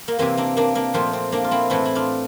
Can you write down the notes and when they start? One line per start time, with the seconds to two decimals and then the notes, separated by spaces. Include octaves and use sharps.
0.08 A#3
0.19 C3 E3 A#3 C4
0.37 A#3 D4
0.57 A#3 D4
0.75 A#3 D4
0.94 A#2 F3 A3 C4
1.13 C4
1.32 A#3 D4
1.44 F4
1.51 C4 E4
1.70 A2 E3 A3 C4 E4
1.85 E4
1.95 D4 F4